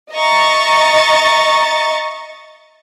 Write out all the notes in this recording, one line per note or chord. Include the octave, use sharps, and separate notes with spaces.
D#5 E5 A#5 C#6 A6